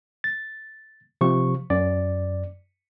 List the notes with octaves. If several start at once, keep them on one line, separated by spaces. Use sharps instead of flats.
A6
C3 F3 C#6
F#2 D5